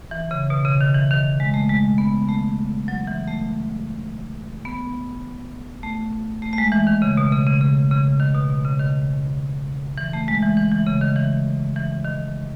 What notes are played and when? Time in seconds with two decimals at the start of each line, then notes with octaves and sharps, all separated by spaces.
0.11 E3
0.31 C#3
0.50 B2
0.65 C#3
0.81 D#3
0.95 E3
1.10 D#3
1.40 G#3
1.54 A3
1.69 G#3
1.98 B3
2.29 A3
2.88 F#3
3.07 E3
3.28 A3
4.65 B3
5.83 A3
6.42 A3
6.53 A3
6.58 G#3
6.72 E3
6.87 D#3
7.02 C#3
7.17 B2
7.32 C#3
7.47 C#3
7.61 C#3
7.91 C#3
8.20 D#3
8.35 B2
8.50 B2
8.65 C#3
8.79 D#3
9.98 E3
10.13 A3
10.28 G#3
10.42 E3
10.57 E3
10.72 E3
10.86 C#3
11.01 D#3
11.16 E3
11.76 E3
12.05 D#3